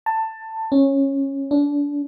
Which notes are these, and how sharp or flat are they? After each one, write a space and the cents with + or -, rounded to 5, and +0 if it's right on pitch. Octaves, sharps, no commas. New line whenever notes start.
A5 +15
C#4 -15
D4 -30